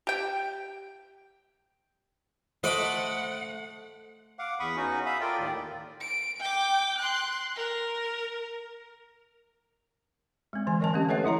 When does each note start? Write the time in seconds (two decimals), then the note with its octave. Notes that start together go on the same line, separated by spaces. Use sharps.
0.07 G4 G5
2.64 A3 C5 D#5 F#5 B5 D6 D7
4.39 F5 F#5 D6
4.60 E2 B5 C#6 D#6
4.76 B3 C#4 D#4 F#4
5.06 E5 F5 B5 D#6
5.21 F4 A4 A#4 D5 G5
5.39 D#2 A2 D#3 D5
6.01 D7
6.40 G5 D6
6.98 C6 F#6
7.56 A#4
10.53 G#3 C4
10.67 D3 E3 G#5
10.80 F#3 A#4 D#5 G#5 A5
10.94 A3 C4 C#4 G4
11.09 A4 B4 C#5 D#5 E5 F#5
11.24 F3 E4 D#5 A#5